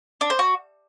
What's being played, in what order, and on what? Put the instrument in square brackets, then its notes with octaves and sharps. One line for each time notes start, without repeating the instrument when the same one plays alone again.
[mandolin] D4
C5
F#4